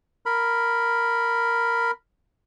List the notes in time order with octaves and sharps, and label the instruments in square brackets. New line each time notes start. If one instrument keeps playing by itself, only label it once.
[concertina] A#4 B5